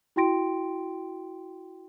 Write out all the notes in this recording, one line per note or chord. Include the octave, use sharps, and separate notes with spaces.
E4 F#4 G5 C6 A#6 D7